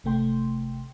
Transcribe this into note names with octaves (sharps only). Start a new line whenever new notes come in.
G#1 C3 A3 G5 C6